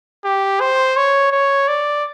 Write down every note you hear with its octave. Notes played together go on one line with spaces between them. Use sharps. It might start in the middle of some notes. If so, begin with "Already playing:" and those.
G4
C5
C#5
C#5
D5